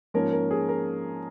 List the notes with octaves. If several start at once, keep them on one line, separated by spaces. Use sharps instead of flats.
G#2 F3 A#3 C#4 A#4
A#4
G#4
A#4